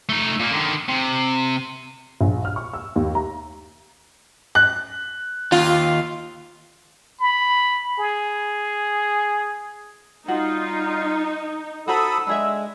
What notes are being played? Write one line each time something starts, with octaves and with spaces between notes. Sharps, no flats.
A3 D#4
A#2 A#3
D3 D#3
C3
A#1
F6
C#6
E6
D#2
A#5
F#6
D#2 F4
B5
G#4
G3 D#4 F4 F#4
F#4 A4 C5 A#5 B5 D#6 E6
G#3 D4 G#4 E5